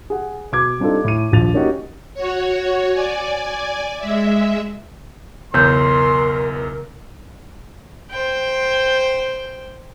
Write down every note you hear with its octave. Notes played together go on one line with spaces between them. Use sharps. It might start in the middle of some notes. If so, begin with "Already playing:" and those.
G#4 F#5
B2 D6 G#6
G3 C4 D4 D#4 F4 A4
A2 D#7
D#1 A#1 F3 A6 F7
A#3 C#4 D#4 F#4 G4
F#4 C#5
D5 G#5
G#3 E5
B1 E2 C#3 A#4 C6 G6
C5 G5